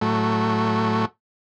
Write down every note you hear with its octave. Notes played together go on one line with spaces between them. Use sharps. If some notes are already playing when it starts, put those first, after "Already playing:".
A2 F#3 A3